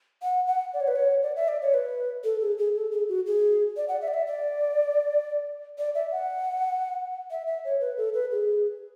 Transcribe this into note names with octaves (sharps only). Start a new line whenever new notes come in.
F#5
F#5
D5
C#5
B4
C#5
D5
E5
D5
C#5
B4
A4
G#4
G#4
A4
G#4
F#4
G#4
D5
F#5
E5
D5
E5
D5
D5
E5
F#5
E5
E5
C#5
B4
A4
B4
G#4